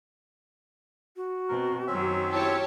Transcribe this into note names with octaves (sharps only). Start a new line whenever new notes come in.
F#4
B2 C4 A#4
F#2 D#3 F#3 C4 C#4 E5
E4 G4 C#5 A5